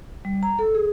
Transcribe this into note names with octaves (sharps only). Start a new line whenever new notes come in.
G3
A#5
A4
G#4